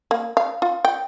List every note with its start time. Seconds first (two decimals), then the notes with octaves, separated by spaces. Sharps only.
0.11 A#3
0.37 F5
0.62 F4
0.85 G5